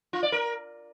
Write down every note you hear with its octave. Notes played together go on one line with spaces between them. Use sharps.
F4
D5
A#4